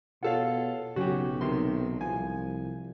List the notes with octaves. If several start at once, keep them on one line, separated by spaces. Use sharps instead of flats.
B2 F4 A4 C#5 F5 F#5
B1 C#3 F#3 C#4 F#4 G4
C3 D#3 C6
C2 F3 G#5